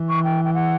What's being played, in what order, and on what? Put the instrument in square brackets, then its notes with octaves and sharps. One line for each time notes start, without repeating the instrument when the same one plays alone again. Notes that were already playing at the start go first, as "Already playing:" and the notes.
Already playing: [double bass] E3
[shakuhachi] C#6
G5
G5
F#5